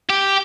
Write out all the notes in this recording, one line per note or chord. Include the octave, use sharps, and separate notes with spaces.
G4